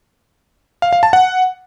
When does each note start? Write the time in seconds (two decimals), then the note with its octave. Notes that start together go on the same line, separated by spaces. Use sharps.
0.82 F5
0.93 F5
1.03 A5
1.13 F#5